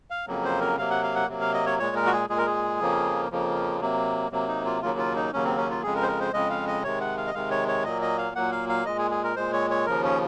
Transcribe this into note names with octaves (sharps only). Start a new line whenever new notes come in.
F5
F2 C#3 F#3 A#3
C5
A#4
C3 F#3 A#3 F5
F#5
F5
F#5
C3 F#3 A#3
F5
D#5
C#5
A#2 G#3 C#5
A#4
F#4
G#4
A#2 G#3 G#4
A#4
G#4
F2 C#3 F3 A#3
F2 C#3 F3 A#3
C3 F#3 A#3
C3 F#3 A#3
D#4
F4
D#2 C#3 F#3 A#3 F4
F4
D#4
D#2 C#3 F#3 A#3 C#4
C4
C#4
F4
F2 C#3 G#3 G#4
A#4
C5
A#4
C5
F2 C#3 G#3 D#5
F5
D#5
C3 D#3 G#3 C#5
F#5
F5
D#5
C3 D#3 G#3 F5
C#5
C#5
A#2 F#3 A#3 D#5
D#5
F5
A#2 F#3 A#3 F#5
F5
F5
A#2 G#3 D#5
G#4
G#4
A#4
A#2 G#3 C5
C#5
C#5
D#2 C#3 F3 A#4
C#4